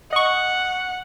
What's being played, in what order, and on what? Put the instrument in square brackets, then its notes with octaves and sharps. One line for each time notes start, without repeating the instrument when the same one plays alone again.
[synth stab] D#5 C#6 [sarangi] F#5